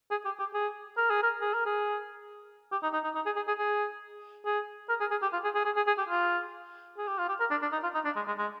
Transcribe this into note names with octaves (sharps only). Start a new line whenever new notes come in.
G#4
G4
G4
G#4
A#4
G#4
A#4
G#4
A#4
G#4
G4
D#4
D#4
D#4
D#4
G#4
G#4
G#4
G#4
G#4
A#4
G#4
G#4
G4
F4
G#4
G#4
G#4
G#4
G#4
G4
F4
G#4
G4
F4
G4
A#4
D4
D4
D#4
F4
D#4
D4
G#3
G#3
G#3